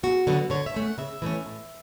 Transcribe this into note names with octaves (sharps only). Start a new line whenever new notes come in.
E2 F#4
D3 F#3 B3
D3 C#5
E5
A3 C#4
F#5
C#3 E5
E3 A3 C#4
A2